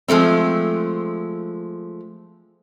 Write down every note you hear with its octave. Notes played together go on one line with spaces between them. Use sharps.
F3 G#3 A3 C4